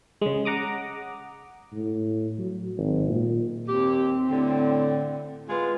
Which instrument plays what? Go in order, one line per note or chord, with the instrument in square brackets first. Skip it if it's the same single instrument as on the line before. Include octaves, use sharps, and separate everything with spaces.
[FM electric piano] C#3 G#3
F#5 A#5 D6 D#6
[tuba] A2
F#3
G#1
A#2
[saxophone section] D#2 G4 [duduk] C4
[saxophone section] A2 D3
G#3 B3 F4